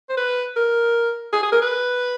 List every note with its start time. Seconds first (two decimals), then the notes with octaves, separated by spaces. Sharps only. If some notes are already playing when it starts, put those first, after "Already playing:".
0.09 C5
0.17 B4
0.56 A#4
1.33 G#4
1.43 G#4
1.52 A#4
1.62 B4